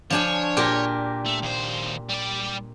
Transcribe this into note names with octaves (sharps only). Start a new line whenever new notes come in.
F3 D4 C#5 G#5
A#2 G4 A#4
A3
D#2 C5
G3 D5